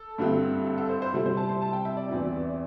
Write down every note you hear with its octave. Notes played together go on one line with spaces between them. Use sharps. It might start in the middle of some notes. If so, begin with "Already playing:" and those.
Already playing: A4
G2 D3 G3 C4 E4
A4
A4
C5
C5
C3 G3 E4 A4
C5
A5
C6
A5
G5
E5
D5
E2 E3 C4 E4